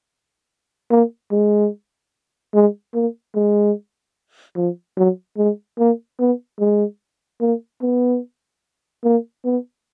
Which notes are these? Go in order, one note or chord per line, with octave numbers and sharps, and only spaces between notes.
A#3
G#3
G#3
A#3
G#3
F3
F#3
G#3
A#3
B3
G#3
A#3
B3
A#3
B3